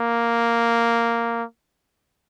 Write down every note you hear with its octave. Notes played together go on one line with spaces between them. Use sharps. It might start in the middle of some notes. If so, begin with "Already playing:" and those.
Already playing: A#3